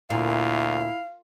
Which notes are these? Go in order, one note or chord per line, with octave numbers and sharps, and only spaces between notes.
D2 A#2 E4 F5